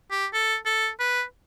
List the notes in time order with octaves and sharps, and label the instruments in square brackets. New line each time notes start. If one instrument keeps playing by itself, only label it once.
[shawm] G4
A4
A4
B4